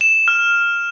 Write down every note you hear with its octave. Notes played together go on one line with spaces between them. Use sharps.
E7
F6